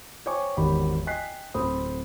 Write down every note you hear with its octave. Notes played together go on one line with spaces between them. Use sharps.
C5 C#5 G5 G#5 C#6 D6
G#1 E2 D#3 G4 C#5 B5
D#5 G5 G#5 F#6 B6 C7
D1 C4 A4 B5 D#6